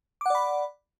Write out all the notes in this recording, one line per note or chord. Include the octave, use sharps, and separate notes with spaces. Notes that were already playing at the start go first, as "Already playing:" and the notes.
D5 F#5 B5 D6